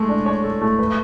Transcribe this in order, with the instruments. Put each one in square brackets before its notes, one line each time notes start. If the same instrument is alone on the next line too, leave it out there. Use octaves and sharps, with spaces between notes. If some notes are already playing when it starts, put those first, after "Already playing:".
Already playing: [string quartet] G#3 [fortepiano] A3 A4
[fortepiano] D4
C#5
A4
A3
B4